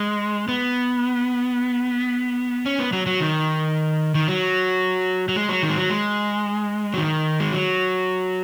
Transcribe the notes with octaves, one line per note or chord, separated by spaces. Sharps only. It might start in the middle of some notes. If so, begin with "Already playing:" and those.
Already playing: G#3
B3
C#4
B3
F#3
F#3
D#3
D#3
F#3
F#3
G#3
F#3
D#3
G#3
F#3
G#3
F#3
D#3
G#3
F#3